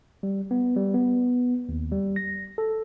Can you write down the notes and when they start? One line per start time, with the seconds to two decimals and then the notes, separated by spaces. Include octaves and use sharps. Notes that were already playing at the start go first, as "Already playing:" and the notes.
0.23 G3
0.51 B3
0.76 G3
0.94 B3
1.69 D#2
1.92 G3
2.16 A#6
2.58 A4